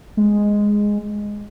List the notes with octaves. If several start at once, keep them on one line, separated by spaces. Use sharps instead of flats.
G#3